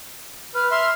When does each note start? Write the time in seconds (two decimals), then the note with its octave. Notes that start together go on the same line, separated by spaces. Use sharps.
0.55 B4 F6
0.71 E5 C6 F6